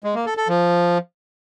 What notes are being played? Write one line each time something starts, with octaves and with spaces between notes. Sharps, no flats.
G#3
A#3
A4
A4
F3